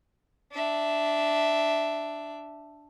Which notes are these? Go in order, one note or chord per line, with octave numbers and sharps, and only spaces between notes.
D4 E5